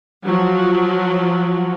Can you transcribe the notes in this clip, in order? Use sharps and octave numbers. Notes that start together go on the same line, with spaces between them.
F3 F#3